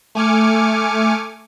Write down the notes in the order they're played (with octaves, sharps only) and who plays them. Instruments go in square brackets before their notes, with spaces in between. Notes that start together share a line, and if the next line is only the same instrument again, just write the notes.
[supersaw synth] A3 G#5 D6 F6 C#7